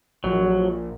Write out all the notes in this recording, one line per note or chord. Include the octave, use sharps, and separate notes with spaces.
A#1 F#3